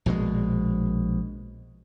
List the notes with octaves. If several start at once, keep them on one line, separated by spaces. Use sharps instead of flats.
A#1 B2 D3 G#3